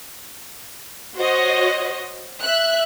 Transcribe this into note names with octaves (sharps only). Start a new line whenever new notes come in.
F#4 C5 C#5 D#5
E5 F#6